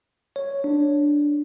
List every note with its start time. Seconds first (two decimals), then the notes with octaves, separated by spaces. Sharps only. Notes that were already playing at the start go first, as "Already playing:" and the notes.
0.36 C#5
0.64 D4